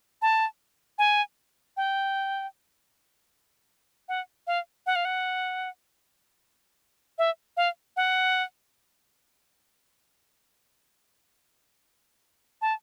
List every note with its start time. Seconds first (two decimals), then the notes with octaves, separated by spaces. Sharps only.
0.22 A5
0.98 G#5
1.77 G5
4.09 F#5
4.47 F5
4.86 F#5
4.96 F5
5.05 F#5
7.18 E5
7.57 F5
7.97 F#5
12.62 A5